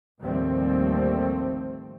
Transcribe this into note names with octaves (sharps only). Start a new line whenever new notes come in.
A1 D#2 F3 G3 A3 C4